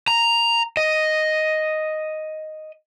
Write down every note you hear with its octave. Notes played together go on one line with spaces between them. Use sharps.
A#5
D#5